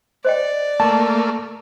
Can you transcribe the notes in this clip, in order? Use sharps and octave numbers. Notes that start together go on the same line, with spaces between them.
C5 D5 D#5 G5
A3 A#3 A5